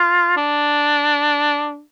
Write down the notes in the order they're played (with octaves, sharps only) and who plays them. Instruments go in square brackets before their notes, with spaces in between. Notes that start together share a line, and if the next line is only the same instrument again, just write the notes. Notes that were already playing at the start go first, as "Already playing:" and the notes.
Already playing: [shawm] F4
D4